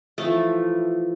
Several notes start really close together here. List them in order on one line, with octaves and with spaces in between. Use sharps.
A3 F3 E3